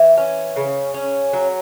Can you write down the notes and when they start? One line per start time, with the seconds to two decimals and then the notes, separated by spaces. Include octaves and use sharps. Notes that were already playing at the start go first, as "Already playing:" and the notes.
Already playing: E3
0.17 C#4
0.56 C#3
0.94 C#4
1.33 F#3